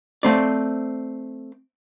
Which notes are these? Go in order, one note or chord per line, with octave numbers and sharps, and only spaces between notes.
A3 C4 D5